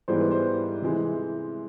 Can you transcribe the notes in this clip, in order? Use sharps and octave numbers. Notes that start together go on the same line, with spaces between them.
G#2 E3 G3 B3 C5
B4
C5
C3 E3 G#3